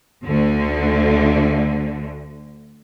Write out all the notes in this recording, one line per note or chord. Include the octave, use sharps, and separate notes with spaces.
D2 D3